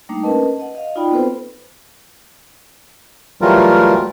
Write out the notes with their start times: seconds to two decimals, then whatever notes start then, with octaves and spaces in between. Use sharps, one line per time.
0.09 G3 A3 A#3 D4 D#4
0.23 C#4 A#4 B4 D#5 A5
0.60 D#5 F#5
0.75 D#5 F5
0.95 D#4 F4 F#4 D5 G5 B5
1.11 B3 C4 A4 B4 C5
3.41 E3 F#3 G3 A3 F4 A#4